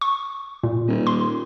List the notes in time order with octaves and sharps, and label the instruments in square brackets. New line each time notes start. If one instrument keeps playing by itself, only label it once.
[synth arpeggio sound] C#6
A#2
[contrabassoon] D#1
[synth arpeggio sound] C6